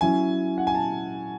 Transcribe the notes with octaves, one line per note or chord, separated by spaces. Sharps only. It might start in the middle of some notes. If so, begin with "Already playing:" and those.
F#3 C#4 E4 G#5
F#5
G#5
A5